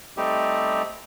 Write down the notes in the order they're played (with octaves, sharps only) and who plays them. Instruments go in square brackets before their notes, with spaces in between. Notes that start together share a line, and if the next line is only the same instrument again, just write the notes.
[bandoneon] G3 A3 C4 D#4 G4